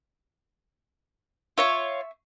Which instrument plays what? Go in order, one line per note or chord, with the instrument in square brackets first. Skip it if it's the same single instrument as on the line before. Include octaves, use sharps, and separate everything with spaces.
[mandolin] F4 C#5 [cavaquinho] E5 C#6